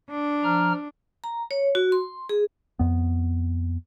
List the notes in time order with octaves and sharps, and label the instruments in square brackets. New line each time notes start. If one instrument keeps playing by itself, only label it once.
[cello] D4
[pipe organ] F3 A#5 F6
[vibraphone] A#5
C#5
F#4
C6
G#4
[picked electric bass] F2 B3